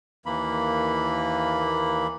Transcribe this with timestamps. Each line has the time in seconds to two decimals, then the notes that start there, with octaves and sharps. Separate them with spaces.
0.26 D#2 E3 A#3 B5